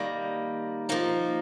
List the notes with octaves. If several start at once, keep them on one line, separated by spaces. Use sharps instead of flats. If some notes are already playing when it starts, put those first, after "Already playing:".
Already playing: D#3 G3 A#3
F3 A#3 D#4